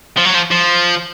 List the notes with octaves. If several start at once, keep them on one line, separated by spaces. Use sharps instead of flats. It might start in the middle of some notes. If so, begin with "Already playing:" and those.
F3
F#3
F3
F3